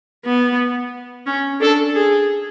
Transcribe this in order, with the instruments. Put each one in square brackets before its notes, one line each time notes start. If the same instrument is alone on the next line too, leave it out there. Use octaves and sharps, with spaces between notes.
[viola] B3
C#4
[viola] D4 [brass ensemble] A4
[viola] G#4